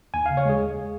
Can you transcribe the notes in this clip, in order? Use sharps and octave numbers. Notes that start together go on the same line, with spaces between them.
D#2 G#5
C#3 F5
C#5
G#3 G#4
D#2